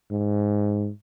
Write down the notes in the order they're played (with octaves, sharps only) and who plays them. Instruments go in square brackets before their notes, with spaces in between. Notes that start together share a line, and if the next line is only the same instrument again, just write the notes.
[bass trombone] G#2